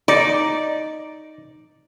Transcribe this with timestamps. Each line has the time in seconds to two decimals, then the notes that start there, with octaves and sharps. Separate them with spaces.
0.08 D#4 D5